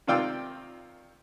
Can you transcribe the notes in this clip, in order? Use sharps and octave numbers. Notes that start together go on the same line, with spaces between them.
C3 D#3 F4 D5 G5 E6